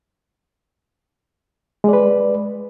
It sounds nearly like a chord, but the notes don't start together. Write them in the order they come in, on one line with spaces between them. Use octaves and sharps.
G#3 D5 B4